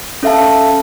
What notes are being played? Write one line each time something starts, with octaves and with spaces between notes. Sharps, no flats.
C#4 A4 E5 F5 A5